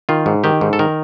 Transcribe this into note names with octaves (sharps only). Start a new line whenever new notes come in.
D#3 F4
G#2
D#3 G4
G#2
A4
D#3 A#4